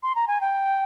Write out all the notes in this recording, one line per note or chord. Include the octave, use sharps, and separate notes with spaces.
C6
A#5
G#5
G5